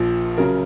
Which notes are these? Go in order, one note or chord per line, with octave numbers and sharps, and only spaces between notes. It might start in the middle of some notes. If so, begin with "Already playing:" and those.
Already playing: A#1 A#2 F3
C#3 F#3 A#4